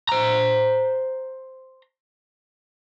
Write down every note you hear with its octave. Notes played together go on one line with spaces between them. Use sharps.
C5 A#5